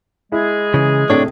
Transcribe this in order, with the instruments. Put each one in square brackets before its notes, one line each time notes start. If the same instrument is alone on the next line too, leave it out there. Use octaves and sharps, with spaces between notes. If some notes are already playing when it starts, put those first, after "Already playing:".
[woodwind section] G#3 G#4 [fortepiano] E4
[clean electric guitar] C#3 [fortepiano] E3
[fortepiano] A2 C3 [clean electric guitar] D4 C#5